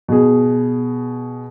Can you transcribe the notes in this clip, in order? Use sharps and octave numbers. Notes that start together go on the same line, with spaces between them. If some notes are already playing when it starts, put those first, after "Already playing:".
B2 G#4